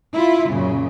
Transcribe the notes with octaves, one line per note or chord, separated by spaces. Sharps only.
E4 F4
F#2 A#2 C#3